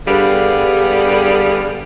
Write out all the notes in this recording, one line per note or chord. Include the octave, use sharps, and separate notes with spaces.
G2 D3 G3 B3 G#4 F5